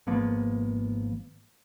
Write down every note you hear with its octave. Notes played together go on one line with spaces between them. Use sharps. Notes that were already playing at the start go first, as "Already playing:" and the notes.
G#1 F3 A#3 B3